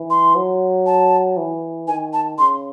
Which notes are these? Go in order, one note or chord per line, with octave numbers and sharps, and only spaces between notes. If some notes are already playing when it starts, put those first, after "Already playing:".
Already playing: E3
C6
F#3
A5
E3
D#3 G#5
A5
C#3 C6